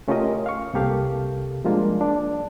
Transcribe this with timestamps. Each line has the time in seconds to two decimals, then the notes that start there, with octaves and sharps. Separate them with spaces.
0.08 A3 C#4 F4 G4 A#4 D#5
0.46 F5 C#6
0.74 C2 C3 A#3 G4 A4 F5
1.65 F3 G3 G#3 A#3 D4 F4
2.01 D4